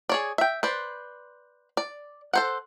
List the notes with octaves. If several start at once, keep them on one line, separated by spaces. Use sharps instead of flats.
G#4 C#5 D5
E5 G5
B4 C5 D5
D5
A4 C5 F#5